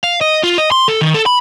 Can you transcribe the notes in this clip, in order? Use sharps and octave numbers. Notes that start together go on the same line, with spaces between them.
F5
D#5
F4
D#5
C6
A4
D#3
A4
B5